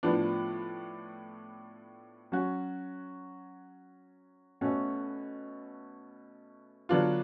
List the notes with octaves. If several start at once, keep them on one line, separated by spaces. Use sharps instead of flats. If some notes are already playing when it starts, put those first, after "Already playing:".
A2 F3 B3 D4
F#3 C#4 F#4
B2 A3 C#4 F#4 A4
D3 F#3 B3 D4 F4